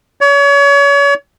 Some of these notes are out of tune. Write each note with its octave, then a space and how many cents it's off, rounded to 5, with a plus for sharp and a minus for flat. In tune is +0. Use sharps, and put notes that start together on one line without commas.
C#5 +35